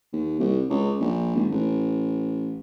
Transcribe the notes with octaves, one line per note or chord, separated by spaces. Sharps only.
D#2
C2
C#2
A#1
G#1
A1